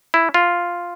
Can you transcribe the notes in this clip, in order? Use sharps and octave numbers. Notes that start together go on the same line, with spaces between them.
E4
F4